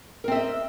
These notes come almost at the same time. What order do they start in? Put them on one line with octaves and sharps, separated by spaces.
A#4 C4 E5 D#5